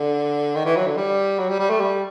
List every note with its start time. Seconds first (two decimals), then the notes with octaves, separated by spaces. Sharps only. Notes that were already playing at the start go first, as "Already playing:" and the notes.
Already playing: D3
0.55 D#3
0.65 E3
0.76 F#3
0.86 D3
0.97 G3
1.39 F#3
1.49 G3
1.60 G3
1.70 A3
1.80 G3